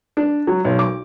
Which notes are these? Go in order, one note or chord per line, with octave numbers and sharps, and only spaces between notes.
D4
F#3
B1
D6